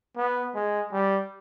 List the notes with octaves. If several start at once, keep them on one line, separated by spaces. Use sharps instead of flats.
B3
G#3
G3